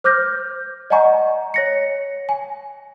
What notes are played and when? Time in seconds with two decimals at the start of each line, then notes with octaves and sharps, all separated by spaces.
0.04 C5 D6 F6 G6 A#6
0.90 D5 D#5 F#5 G#5 A#5 C#6
1.54 C#5 A#6 C#7
2.29 G#5